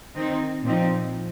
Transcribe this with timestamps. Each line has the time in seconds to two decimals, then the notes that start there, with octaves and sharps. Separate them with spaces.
0.16 D#3 C4 D#4
0.63 A#2 F3 C4 D#4